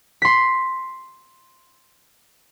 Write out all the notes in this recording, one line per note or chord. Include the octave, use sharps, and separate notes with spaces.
C6 B6